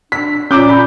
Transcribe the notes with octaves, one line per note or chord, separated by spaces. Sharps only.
D4 B6
A#2 C#4 A#5 D6 G6
B5